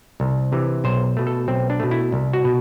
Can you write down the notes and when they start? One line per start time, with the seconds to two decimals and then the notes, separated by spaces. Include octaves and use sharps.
0.20 C2
0.52 C3 E3
0.84 B1 C5
1.17 B2 A3
1.27 A4
1.48 B1 C4
1.70 D4
1.80 B2 A3
1.91 E4
2.12 C2
2.33 F#4
2.44 B2